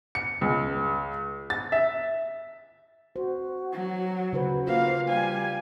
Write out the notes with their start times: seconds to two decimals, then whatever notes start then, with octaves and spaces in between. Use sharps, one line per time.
0.15 C#7
0.41 C#2
1.50 A6
1.72 E5
3.16 F#4 C5
3.73 F#3
4.33 C#3 F#4 B4 C5
4.67 A#3 F4 F5
5.08 G3 F5 G#5